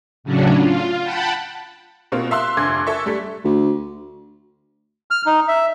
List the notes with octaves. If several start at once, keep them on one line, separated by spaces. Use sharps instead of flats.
A2 C#3 F#3 C#4 D4
F4
F#5 G5 A5 B5
B2 A#3 C4 F4
E5 F5 C6 E6 F#6
F1 G2 C6 D6 G#6
A4 E5 C#6
G3 A3 B6
D2
F6
D#4
E5